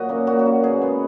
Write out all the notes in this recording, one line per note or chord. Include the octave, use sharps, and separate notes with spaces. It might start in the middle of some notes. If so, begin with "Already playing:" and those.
Already playing: A#2 F#3 F#4 D#5
A#3 C#4
A#2 F#4
F#4
A#3 C#4
B2 G#4
G#3 B3